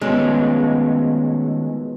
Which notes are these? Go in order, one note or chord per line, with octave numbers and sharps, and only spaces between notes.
B2 D#3 F3 G#3 A3 C#4